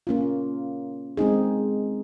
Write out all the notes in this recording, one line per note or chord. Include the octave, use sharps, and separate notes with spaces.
A#3 C#4 F4
G#3 C4 D#4 G#4